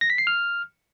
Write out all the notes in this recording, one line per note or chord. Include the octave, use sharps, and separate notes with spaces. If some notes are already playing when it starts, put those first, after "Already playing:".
A#6
B6
C7
F6